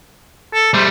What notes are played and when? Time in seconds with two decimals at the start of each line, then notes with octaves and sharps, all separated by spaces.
0.54 A4
0.74 G3 A3 C5